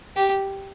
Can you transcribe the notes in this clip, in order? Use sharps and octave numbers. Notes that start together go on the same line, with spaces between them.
G4